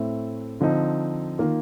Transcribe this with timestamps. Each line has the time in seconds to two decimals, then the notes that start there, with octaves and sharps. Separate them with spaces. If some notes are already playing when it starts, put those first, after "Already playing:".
Already playing: A2 A3 C4
0.61 D3 F3 C4 D#4
1.39 D#3 A#3 F4